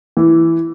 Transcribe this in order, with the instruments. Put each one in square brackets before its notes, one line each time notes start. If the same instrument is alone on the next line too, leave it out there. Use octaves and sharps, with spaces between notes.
[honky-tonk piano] E3